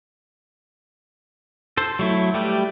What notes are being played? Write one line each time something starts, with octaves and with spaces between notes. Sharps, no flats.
A4 C5
F#3 A3 E4
G3 A3 G4 B4